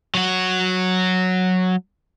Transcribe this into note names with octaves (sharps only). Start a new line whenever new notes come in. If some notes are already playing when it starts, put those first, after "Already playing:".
F#3 F#4